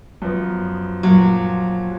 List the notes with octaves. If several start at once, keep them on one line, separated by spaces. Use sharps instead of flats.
F#2 F3 B3
A#2 F3 F#3 A#3